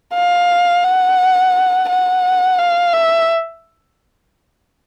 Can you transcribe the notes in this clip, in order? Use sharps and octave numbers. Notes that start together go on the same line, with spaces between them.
F5
F#5
F#5
F5
E5